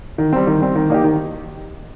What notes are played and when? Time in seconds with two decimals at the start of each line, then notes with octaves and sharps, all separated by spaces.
0.18 D#3
0.33 G3 C4
0.47 D#3
0.61 G3 C4
0.75 D#3
0.90 A#3 D#4 G4
1.04 D#3